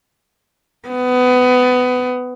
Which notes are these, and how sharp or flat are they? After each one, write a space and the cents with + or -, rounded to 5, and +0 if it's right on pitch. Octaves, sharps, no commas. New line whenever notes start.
B3 +20